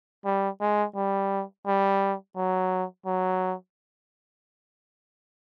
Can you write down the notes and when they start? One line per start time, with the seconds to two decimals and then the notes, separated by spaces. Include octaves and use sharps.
0.25 G3
0.61 G#3
0.95 G3
1.66 G3
2.36 F#3
3.06 F#3